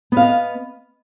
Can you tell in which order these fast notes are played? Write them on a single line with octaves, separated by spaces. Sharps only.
B3 F5 D#5